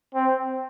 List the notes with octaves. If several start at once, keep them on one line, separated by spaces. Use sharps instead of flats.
C4